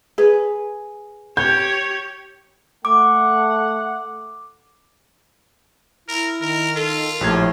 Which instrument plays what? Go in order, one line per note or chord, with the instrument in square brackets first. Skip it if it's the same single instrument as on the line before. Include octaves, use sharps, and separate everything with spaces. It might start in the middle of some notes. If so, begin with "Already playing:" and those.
[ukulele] G#4 B4
[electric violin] G4 C#5 [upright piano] G6
[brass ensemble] A3 F#5 [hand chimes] D6
[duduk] E4 [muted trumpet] A#4
[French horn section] D#3 [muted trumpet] A#4
[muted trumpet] F4 [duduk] A4
[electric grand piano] A#1 G4 G#6 [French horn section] A2 [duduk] F3